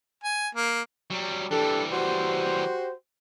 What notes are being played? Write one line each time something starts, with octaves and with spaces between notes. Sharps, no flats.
G#5
A#3
F#3 G3
E3 G3 D4 G4 A4
F#4 G4 C5